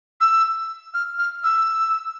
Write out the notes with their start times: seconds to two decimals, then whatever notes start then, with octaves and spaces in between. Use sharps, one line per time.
0.21 E6
0.94 F6
1.19 F6
1.44 E6